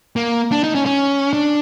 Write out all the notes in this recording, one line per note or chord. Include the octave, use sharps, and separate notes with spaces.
A#3
D4
D#4
C#4
C#4
D4